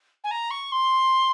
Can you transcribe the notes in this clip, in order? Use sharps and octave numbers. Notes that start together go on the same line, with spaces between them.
G#5
A#5
C#6
C6